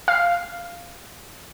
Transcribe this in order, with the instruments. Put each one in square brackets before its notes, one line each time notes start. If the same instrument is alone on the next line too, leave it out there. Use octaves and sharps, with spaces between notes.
[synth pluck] F5